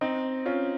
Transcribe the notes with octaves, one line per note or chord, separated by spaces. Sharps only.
C4 D#4
C#4 F4